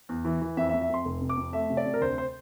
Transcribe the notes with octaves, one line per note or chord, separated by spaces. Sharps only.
E2
E3
E3
F2 E5
E5
F2
E5
F2 C6
F1
C3
D6
F2
A3 E5
C3
D5
C3
A#4
D2 C5
C5